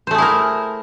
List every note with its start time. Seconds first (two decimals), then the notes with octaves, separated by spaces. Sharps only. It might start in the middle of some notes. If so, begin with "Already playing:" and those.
0.07 C5
0.11 A3
0.15 G#4
0.18 E4
0.22 A#4